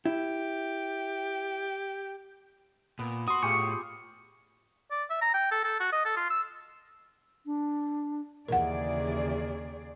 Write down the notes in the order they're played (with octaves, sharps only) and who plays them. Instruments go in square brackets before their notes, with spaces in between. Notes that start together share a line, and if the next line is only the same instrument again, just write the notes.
[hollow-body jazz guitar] E4 [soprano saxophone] G4
[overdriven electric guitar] A#2 [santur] B3
[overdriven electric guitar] F#4 [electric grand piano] C6 D#6
[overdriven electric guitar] A2 [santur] F4 G4 G#4 [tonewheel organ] C#6
[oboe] D5
E5
A#5
G5
A4
A4
F#4
D#5
A4
F4
E6
[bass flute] D4
[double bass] D#2 [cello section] C#3 G#4 D5 [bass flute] E3 [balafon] A#4 F#5